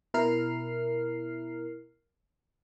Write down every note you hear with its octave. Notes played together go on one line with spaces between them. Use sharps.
B2 E4 A#4 F6 C7